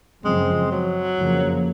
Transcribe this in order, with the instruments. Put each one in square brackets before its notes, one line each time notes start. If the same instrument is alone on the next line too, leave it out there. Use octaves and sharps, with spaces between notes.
[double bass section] F#2 C#3 F3 C4 [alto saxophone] G#3
[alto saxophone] F#3
[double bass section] F2 C#3 F3 A#3